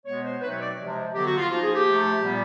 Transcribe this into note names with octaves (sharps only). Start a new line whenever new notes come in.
B2 G#3 B3 C#5
C5
B2 F#3 A3 C4 D#4 B4
C#5
D5
C3 F3 G#3
D3 F#3 B3 G4
F#4
F4
F3 A#3 D#4 F4
G#4
G4
C3 F3 A3
A#2 G3 B3